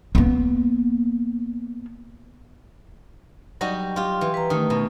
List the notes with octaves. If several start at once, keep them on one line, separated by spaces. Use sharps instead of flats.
A#3 B3
F#3 G3 D#4 F#4
F4 G4
E3
B4 A#5
D#3 A3 C#4 D#6
B2